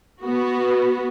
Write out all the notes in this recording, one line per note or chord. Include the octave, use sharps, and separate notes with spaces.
B3 F#4